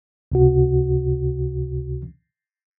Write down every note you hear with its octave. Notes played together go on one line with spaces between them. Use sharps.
C#2 C3 F#4